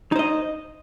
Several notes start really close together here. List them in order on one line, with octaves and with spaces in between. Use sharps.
D#4 C5 D#5